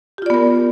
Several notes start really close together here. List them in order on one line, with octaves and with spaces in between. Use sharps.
G4 F4 D5 B3 A#4